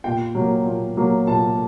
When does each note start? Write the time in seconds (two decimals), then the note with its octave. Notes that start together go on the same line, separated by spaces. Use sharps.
0.04 A#2 G5
0.35 F#3
0.40 A#3
0.66 A#2
0.97 F#3 A#3
1.27 A#2 A5